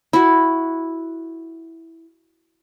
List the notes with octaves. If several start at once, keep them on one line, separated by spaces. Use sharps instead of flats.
E4 F#4